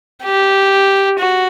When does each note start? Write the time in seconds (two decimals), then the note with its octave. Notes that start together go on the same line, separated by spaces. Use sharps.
0.24 G4
1.19 F#4